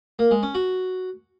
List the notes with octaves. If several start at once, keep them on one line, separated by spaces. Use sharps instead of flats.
A#3
G#3
C#4
F#4